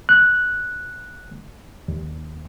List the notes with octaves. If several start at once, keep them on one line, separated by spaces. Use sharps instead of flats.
F#6
D#2